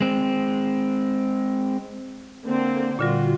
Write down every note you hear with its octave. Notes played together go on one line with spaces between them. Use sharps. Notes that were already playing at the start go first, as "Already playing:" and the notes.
G#3 C4
D3 A#3 C4
A#2 D3 G3 F4 F#4